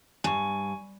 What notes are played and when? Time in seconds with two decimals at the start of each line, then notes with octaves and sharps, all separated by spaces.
0.24 G2 G#5 C#6